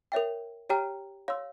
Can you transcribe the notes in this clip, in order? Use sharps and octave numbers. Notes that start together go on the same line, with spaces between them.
A#4 C#5 E5 G5
G4 C#5 G5 A#5 F6
C#5 F5 C6 E6